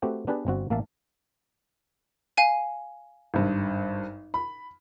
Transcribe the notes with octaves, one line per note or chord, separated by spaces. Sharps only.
A3 C4 F#4 G4 B4
B3 D4 G4 G#4 B4 D5
G1 C4 F#4
A1 A#3 E5 F5 A5
F5 G#5 D#7
G#1 G2
B5